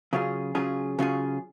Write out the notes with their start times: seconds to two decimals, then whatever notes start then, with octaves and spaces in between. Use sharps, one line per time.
0.13 C#3 F#3 C#4 F4 G#4
0.55 C#3 F#3 C#4 F4 G#4
0.99 C#3 F#3 C#4 F4 G#4